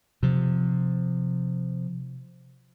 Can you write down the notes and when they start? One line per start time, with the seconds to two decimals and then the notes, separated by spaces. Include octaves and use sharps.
0.23 C3 F3